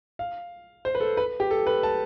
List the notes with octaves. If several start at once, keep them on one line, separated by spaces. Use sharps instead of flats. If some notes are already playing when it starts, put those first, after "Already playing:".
F5
C5
B4
A4
B4
G4
A4
B4
A5